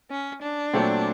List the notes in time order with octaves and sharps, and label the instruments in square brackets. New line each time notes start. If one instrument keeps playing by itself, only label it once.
[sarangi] C#4
D4
[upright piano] A#2 F#3 A3 C4